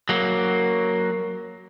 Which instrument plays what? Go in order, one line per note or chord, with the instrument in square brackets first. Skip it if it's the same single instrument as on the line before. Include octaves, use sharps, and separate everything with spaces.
[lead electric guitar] F#3 A#3